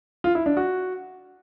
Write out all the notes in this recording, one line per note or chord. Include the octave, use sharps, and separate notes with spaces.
F4
E4
D4
F#4